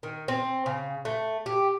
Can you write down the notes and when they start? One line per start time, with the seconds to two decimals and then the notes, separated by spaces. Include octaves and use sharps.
0.03 D#3
0.28 C4
0.66 C#3
1.05 A3
1.46 G4